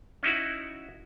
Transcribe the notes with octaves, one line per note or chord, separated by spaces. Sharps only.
C#4 D#4 E4 F#4